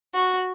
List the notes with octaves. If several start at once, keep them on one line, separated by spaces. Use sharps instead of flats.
F#4